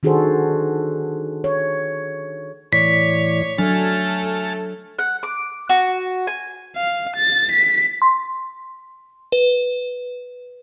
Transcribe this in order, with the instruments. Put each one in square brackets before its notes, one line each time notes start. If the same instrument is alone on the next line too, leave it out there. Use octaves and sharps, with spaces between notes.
[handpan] D#3 D4 F#4 G#4 A4 C5
C#5
[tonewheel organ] A2 E3 D5 [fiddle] C#5 [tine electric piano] B6
[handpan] F#3 D4 [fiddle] A3 A4 [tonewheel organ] G#5 F6 A6
[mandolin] F#5
D6
F#4
G#5
[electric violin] F5
A6
B6
[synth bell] C6
B4